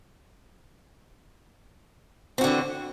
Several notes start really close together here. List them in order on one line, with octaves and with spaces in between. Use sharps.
C4 F#4 D3 E3